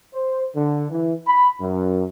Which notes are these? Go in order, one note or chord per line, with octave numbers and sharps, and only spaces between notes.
C5
D3
E3
B5
F#2